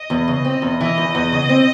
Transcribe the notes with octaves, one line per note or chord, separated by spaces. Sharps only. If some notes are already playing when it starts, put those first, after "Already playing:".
Already playing: D#5
E2
C#3
C4
E2
E3 D#5
E2
E2
C#3
C4